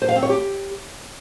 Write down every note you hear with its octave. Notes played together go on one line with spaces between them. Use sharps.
C5
F5
C4
C#5
G4